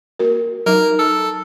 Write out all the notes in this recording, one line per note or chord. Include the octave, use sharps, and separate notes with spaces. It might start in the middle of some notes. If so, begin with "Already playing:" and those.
A#3 F#4 A#4
F#3 D#4 A#4
A4